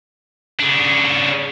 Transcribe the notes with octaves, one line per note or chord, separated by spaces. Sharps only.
C#3 D4